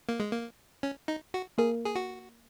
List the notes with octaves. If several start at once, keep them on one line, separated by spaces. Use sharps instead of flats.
A#3
G#3
A#3
C#4
D#4
F#4
A#3 G#4 A#4
G#4
F#4